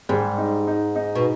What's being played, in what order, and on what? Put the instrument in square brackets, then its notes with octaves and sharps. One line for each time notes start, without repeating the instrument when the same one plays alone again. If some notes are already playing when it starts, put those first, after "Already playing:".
[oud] G#2 [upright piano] G3
[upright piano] D#4
D#4
D#4
[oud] B2